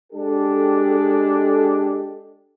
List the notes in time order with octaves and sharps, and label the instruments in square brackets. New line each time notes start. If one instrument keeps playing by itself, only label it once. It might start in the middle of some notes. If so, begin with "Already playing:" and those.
[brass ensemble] G#3 D4 G4 A4